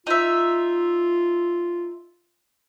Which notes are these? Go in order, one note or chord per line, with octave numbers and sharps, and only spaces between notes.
D#4 F4 E5